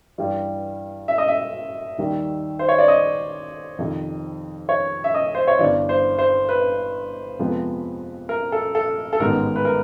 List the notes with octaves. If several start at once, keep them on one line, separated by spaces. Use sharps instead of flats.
G2 E3 G3
E5
D#5
E5
D#2 D#3 G3
C5
C#5
D5
D#5
F2 C3 D#3
C#5
E5
D#5
C5
C#5
G1 G2 E3 D5
C5
C5
B4
F2 C3 F3 G#3 B3
A#4
A4
A4
A4
A1 G#2 D#3 G#3 B3 A#4
B4
A#4